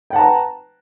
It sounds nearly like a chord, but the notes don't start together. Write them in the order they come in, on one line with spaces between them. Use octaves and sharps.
G5 F#5 A5 A#5 B4